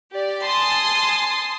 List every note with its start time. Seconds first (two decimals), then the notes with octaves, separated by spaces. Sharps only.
0.12 G4 D5
0.46 G#5 A5 C6 D#6